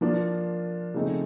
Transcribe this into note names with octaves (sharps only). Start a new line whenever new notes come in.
F3 A#3 D4 F4
C#3 F3 A3 C4 D#4